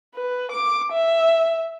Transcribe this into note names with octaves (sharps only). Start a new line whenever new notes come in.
B4
D6
E5